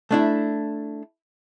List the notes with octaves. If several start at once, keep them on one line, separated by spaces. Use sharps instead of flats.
A3 D4 E4